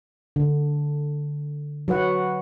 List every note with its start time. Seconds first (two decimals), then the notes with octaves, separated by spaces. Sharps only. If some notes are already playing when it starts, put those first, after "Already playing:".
0.36 D3
1.88 F#3 F#4 B4 F#5